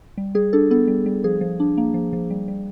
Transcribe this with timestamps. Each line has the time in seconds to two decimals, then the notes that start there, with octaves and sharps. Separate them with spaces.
0.18 G3
0.35 G3 G#4
0.53 D4 A4
0.71 B3 A4
0.88 G3
1.06 G3
1.24 F3 G#4
1.41 F3
1.60 D4
1.77 A#3
1.94 F3
2.13 F3
2.30 G3
2.48 G3